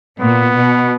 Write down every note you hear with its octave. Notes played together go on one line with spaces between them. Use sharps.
A#2 B3
B2